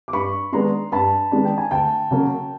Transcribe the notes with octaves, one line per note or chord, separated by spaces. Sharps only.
D6
G2 B5 C#6
D#3 G#3 B3 D4 A#5 C6
G2 A5 B5
D#3 G#3 B3 D4
G5
G#5
D2 G5 A5
C#3 F#3 A#3